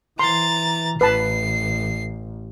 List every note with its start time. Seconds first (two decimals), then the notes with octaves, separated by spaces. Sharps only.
0.19 E3 A#5 C6 A6
1.01 A1 B4 A5 C7